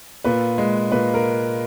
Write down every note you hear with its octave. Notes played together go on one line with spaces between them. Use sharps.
A#2 B4
G#3
A#2 B4
A#4